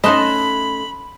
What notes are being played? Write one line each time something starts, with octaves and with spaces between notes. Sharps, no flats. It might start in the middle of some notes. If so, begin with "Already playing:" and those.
A3 C#4 D#4 D#5 A5 B5 C6 F#6